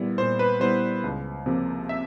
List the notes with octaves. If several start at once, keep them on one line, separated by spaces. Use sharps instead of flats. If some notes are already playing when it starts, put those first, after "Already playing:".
Already playing: A#2 G3 B3 E4
A#2 C5
B4
G3 B3 E4 C5
C#2
C3 F3 A#3
E5